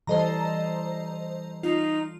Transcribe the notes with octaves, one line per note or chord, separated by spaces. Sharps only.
E3 G3 A4 C5 D#5 A#5
D#4 F4